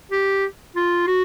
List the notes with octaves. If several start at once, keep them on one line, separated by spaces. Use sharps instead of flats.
G4
F4
F#4